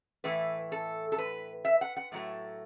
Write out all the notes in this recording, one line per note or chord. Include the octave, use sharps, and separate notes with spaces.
A2 E3 A3 E4 B4
A4
A4
B4
E5
F#5
F#5
A2 F#3 A3